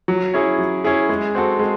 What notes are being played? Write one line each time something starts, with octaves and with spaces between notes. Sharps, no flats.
F#3
C#4 E4 G#4
F#3
C#4 E4 G#4
G#3
C4 F#4 A4
G#3